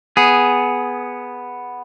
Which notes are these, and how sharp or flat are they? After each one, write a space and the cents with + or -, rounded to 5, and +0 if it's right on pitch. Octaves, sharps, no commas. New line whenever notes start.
B3 +0 G#4 +0